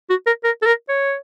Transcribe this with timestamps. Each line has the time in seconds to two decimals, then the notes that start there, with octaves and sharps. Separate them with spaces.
0.10 F#4
0.27 A#4
0.44 A#4
0.62 A4
0.66 A#4
0.89 C#5